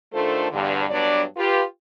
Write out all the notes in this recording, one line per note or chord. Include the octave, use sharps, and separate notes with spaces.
D#3 A3 D4 F4 A4 C5
E2 G2 D3
G2 F#3 B3 D4 D5
F4 G4 B4